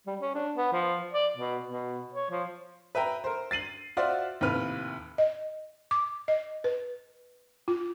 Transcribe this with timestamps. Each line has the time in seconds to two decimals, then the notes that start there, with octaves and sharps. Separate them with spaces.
0.07 G3
0.21 C#4
0.34 D4
0.56 B3
0.72 F3
1.13 D5
1.36 B2
1.65 B2
2.14 C#5
2.31 F3
2.95 B4 E5 G5 A#5
3.24 A#4 C5
3.51 A6 C7 D#7 F#7
3.97 F4 F#4 C5 D5 E5
4.41 D#2 A2 C3 B4 F6
5.18 D#5
5.91 D6
6.28 D#5
6.64 B4
7.68 F4